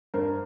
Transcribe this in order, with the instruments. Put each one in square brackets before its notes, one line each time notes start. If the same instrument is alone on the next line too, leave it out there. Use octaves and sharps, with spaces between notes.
[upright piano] G2 A#4 C5